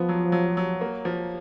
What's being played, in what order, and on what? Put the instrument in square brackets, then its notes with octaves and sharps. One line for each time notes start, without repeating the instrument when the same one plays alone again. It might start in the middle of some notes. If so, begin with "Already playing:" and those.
Already playing: [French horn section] F3 [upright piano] B3
[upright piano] F#3
F#3
F#3
A#3
F3